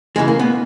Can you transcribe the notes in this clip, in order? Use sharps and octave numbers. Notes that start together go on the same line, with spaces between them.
E2 C#3 E3 G#3
A#3
B3